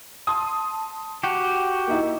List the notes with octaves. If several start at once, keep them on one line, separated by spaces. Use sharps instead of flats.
A5 C6 D#6
F#4 G4
A#3 D#4 E4